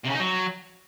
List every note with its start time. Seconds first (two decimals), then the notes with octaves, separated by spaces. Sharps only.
0.04 C3
0.09 C#3
0.14 D#4
0.19 F#3